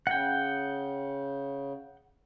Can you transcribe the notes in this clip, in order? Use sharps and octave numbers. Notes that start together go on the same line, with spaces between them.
C#3 F#5 G5